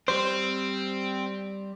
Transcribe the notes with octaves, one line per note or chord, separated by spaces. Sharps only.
G3 C4 C5